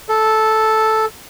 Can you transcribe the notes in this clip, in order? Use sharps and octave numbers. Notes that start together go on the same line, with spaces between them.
A4